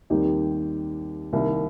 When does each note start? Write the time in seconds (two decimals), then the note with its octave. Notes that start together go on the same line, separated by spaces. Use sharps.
0.10 D#2 D#3 G3 C4 D#4 G4
1.32 C2 C3 D#3 A#3